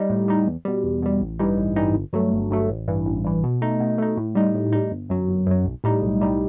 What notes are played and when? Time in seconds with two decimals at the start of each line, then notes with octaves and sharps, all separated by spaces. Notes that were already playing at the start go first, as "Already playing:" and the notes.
Already playing: G3 D#4
0.10 A2
0.28 G3 D#4
0.47 E2
0.65 B2 G3
0.84 E2
1.03 B2 G3
1.21 A1
1.39 G2 E3 G3 D#4
1.58 A1
1.76 G2 E3 G3 D#4
1.95 G1
2.13 G2 F#3 A3
2.32 G1
2.51 G2 F#3 A3
2.69 A1
2.88 G2 E3
3.06 A1
3.24 G2 E3
3.43 B2
3.62 A3 D#4
3.80 B2
3.98 A3 D#4
4.17 A2
4.35 G3 D#4
4.54 A2
4.73 G3 D#4
4.91 G1
5.09 F#2 F#3
5.28 G1
5.47 F#2 F#3
5.65 B1
5.84 A2 G3 D#4
6.02 B1
6.20 A2 G3 D#4